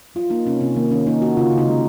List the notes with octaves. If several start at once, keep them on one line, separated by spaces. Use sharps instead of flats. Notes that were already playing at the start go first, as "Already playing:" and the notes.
F#3 F4
A#3 D#4
C3 C#4
C3 C4
D#3 A#3
D#3 C#4
A#3 D#4
A#3 F#4
C#3 F4
C#3
D#4
G#3